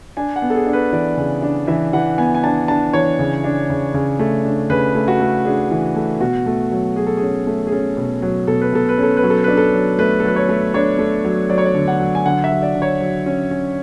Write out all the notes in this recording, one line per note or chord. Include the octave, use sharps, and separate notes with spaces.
D4 G#5
F#5
B3
A4
G#4
D4
B4
E3 D5
C#3
D4
E3 E5
E3 F#5
B3 G#5
G#5
D4 A5
D4 A5
E3 C#5
C#3
D4
C#3
C#3
A3
D4
C#3 B4
A3
F#4
A3
D4 G#4
E3
A3
B2 F#4
A3
F#3
F#3 G#4
A4
C#4 G#4
A3
G#4
C#4 A4
B2
F#3
B2 A4
B4
B2 A4
B4
C#4
A4
B4
F#3
A4
D4 B4
A4
F#3
A3 B4
A4
F#3 B4
C#5
A3
D4 C#5
A3
F#3
F#3 D5
C#5
D5
D3
F#5
F#3
G#5
D3 F#5
E5
F#3
D5
D3
C#5
F#3
C#4
C#4